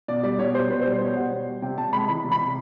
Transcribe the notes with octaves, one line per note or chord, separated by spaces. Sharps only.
B2 D5
G3 D5
B2 C#5
G3 C5
B2 B4
C5
G3
C5
B2 C#5
G3 F#5
B2
G3
C3 G5
C3 A5
G#3 B5
E3 B5
C3
B5
C3